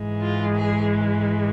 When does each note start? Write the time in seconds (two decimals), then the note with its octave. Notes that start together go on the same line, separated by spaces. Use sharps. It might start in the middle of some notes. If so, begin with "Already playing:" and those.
Already playing: G#2 E3 G#3
0.21 F4
0.56 G#4